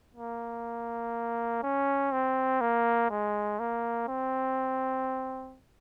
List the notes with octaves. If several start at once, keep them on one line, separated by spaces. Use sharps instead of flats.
A#3
C#4
C4
A#3
G#3
A#3
C4